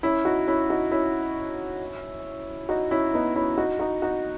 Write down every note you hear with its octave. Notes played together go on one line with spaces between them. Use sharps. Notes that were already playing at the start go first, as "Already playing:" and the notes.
C#4 E4
D#4 F#4
C#4 E4
D#4 F#4
C#4 E4
D#4 F#4
C#4 E4
B3 D#4
C#4 E4
D#4 F#4
D#4 F#4
D#4 F#4